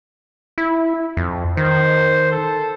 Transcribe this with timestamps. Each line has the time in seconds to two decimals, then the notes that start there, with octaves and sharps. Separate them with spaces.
0.58 E4
1.17 F2
1.57 D#3 C5
2.31 A4